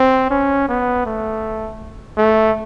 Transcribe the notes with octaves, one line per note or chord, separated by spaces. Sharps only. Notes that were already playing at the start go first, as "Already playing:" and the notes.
Already playing: C4
C#4
B3
A3
A3